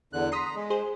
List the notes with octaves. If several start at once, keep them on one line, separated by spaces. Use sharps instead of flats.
E2 D3 F#6
A#5 C6 D#6 B6
G#3
G#4 C5